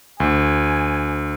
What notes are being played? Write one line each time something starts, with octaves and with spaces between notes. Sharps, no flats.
D2 G#5